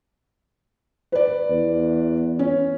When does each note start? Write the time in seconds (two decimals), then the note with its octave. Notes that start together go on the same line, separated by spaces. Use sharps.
1.12 B4 D5
1.50 E2
2.39 C#4